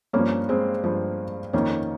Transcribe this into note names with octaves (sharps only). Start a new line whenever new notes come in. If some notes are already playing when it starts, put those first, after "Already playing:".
G2 F3 A#3 C#4
G#3 C4
G2 F3
F2 D#3 A#3 C#4